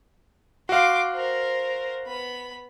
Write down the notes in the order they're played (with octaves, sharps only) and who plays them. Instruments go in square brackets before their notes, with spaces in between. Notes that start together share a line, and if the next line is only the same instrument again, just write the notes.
[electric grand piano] F#4 F5 [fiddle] C6 D6
[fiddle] A#4 C5
B3 B5